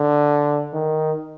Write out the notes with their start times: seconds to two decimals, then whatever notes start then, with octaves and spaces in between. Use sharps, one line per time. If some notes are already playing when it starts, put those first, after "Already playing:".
Already playing: D3
0.73 D#3